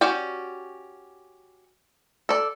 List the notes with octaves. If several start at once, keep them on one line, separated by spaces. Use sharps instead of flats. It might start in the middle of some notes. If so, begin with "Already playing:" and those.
C#4 F#4 G4 D5 G5
A4 D5